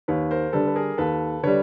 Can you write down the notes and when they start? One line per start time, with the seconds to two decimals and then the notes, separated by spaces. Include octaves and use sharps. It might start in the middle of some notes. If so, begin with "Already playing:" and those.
0.08 D#2 B4 C#5
0.31 A#4 C5
0.53 D3 G3 A4 B4
0.67 B4
0.76 G#4 A#4
0.98 D#2 A4 B4
1.43 D3 G3 B4 C#5